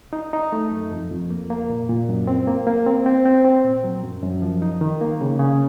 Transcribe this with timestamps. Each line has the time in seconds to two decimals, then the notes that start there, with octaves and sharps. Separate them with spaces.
0.13 D#4
0.33 D#4
0.52 A3
0.71 F#2
0.92 F2
1.11 F2
1.30 A#3
1.50 A#3
1.69 A#2
1.89 A#2
2.09 F#2
2.27 C4
2.47 A#3
2.67 A#3
2.86 C4
3.06 C4
3.25 C4
3.45 C4
3.65 A#2
3.84 F#3
4.04 F#2
4.23 F#2
4.42 F3
4.62 D#4
4.81 D#3
5.01 A#3
5.21 C#3
5.40 C#3